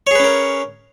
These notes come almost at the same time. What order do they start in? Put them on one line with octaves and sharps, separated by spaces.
C#5 G#4 B4 C#4 A#4